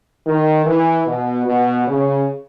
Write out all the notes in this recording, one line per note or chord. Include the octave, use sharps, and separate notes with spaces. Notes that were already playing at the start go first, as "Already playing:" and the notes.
D#3
E3
B2
B2
C#3